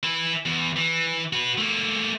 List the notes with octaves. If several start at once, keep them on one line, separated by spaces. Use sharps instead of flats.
E3 E4
E2
E3
F#4 B4
A3 A#3